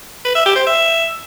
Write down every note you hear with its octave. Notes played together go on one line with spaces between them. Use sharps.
B4
E5
G4
C5
E5